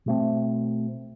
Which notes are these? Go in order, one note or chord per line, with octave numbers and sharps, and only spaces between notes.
B2 A3 C4